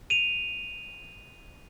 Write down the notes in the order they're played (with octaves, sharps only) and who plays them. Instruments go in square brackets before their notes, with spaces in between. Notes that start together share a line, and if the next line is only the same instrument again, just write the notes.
[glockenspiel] D#7 F7